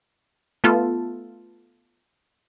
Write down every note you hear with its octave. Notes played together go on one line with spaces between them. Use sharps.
A3 B3 F4 A4